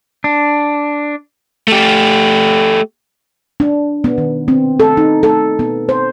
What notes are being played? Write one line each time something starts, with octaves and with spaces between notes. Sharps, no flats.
D4
A3 G4
D4
B3
D#3
C4
A4
D#4
A4
B3
C5